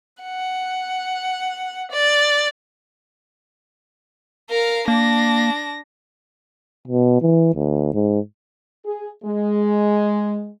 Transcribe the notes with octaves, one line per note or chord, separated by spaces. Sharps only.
F#5
D5
A#4 F5
A#3 D4 A#6
B2
E3
D2
G#2
G#4
G#3